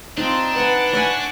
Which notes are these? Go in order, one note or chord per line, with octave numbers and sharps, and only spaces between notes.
C4 D4 D#4 F4
B4 F#5 G#5 A5
D5 E5 F#5 G#5 C#6